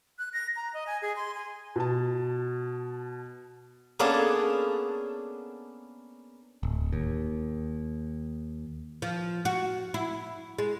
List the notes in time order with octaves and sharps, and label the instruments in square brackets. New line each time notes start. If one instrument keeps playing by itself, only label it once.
[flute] F#6
A#6
A#5
D#5
G#5
G#4
C6
G#5
[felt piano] B2 A5
[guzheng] A#3 B3 C#4 D4 G#4 A4
[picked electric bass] D1
D#2
[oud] F3
F#4
E4
G#3